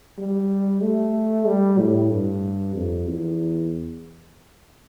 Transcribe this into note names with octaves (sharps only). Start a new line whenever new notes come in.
G3
A3
G3
A2
G2
F2
E2